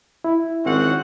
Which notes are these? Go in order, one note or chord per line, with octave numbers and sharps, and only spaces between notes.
E4
G#1 C4 C#4 F#5